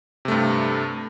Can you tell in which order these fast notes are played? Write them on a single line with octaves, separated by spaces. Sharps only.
C3 A3 G2